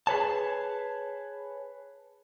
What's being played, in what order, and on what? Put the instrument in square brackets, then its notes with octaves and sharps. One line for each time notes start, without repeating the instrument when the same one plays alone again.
[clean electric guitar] G#4 B4 C#5 A5